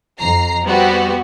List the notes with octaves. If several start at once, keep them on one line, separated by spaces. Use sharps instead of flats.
F2 A#5 C7
G3 B3 C4 F#4 G4